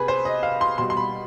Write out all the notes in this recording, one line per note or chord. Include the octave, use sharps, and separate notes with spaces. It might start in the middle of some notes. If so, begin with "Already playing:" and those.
Already playing: C3 G#4 B4
C5
D#5
F5
C6
B2 G3 C6
C6
B5